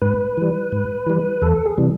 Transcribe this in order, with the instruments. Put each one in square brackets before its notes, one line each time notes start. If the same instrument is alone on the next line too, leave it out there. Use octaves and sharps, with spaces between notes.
[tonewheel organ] G#2 B4
E3 G3
G#2
E3 G3
E2 A4
G#4
C3 E3 G3